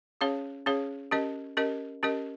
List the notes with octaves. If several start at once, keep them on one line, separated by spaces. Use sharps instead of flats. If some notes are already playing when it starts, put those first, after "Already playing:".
C#4 G#4 C#5 F5
C#4 G#4 C#5 F5
C#4 G4 A#4 D#5
C#4 G4 A#4 D#5
C#4 G4 A#4 D#5